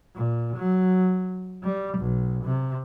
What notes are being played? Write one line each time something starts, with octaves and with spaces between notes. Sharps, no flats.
A#2
F#3
G3
B1
C3